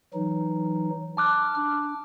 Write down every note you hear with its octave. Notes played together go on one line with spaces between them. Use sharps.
E3 F#3 D#4
A5 D6 F6 F#6
D4